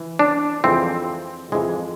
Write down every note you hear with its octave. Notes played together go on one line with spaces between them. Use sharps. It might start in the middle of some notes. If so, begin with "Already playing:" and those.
Already playing: E3
D4
F2 E3 G#3 C4
F2 E3 G#3